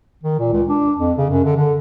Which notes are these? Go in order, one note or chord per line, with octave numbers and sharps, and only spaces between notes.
D#3
A#2
C#2
D4
F2
C#3
F#2
D3
D3